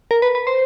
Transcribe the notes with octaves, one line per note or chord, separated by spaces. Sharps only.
A#4
B4
B4
C5